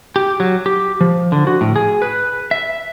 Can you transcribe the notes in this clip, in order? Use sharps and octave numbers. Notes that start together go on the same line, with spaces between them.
G4
F#3
G4
F3
D3
F#4
A2
G#4
B4
E5